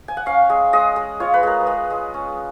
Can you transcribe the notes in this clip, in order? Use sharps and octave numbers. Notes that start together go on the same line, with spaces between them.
G#5
F#5
C#4 F5
G#3
G#3 D#5
G#3
F4 C#5
B4
G#3 A#4
B4
G#3
G#3
C#4